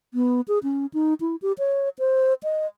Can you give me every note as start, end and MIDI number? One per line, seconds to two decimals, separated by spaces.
0.14 0.41 59
0.48 0.59 68
0.63 0.86 61
0.94 1.14 63
1.20 1.36 64
1.42 1.53 67
1.58 1.89 73
1.99 2.34 72
2.43 2.66 75